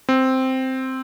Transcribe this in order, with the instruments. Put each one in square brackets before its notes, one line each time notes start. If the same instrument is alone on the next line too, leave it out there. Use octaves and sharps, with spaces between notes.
[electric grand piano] C4